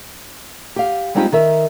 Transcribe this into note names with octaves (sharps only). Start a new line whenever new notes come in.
G4 F5
G3 G#3 C4 D#4 F4 G4
D#3 A#4 E5